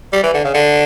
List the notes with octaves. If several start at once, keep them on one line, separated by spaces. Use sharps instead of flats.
G3
E3
D3
C#3
D3